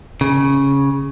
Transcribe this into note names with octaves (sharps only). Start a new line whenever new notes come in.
C#3